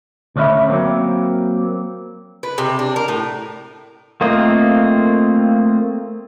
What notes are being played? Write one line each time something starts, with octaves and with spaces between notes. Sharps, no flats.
D2 D3 C#4 F4 E5 B5
F#3 A#3 C4
B4
C3
D4
A#4
A2
A3 A#3 C4 F4 D#5